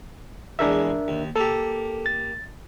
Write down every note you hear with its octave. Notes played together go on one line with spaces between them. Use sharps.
E2 G#3 D4 A#4 E5
D#2
A#3 G4 A4
A6